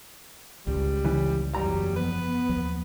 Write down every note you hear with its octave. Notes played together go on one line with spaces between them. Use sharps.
G#1 C#2 G3
C#3 E3
F#1 E2 F#3 G3 A#5
F3 B3 B4
D#2 F3 F#3